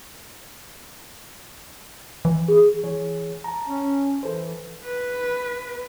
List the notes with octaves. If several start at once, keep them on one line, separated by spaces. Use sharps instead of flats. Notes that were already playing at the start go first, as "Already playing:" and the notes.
E3
G#4
E3 G#4 C#5
A5 A#5
C#4
E3 A4 C5
B4